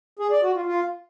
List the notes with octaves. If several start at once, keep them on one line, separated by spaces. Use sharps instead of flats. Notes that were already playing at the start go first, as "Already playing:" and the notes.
G#4
D5
F#4
F4
F4